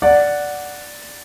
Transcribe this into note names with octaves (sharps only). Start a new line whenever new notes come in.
D5 F#5